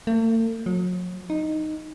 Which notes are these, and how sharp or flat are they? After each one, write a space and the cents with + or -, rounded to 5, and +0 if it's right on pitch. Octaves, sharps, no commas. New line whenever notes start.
A3 +45
F#3 -40
D#4 -5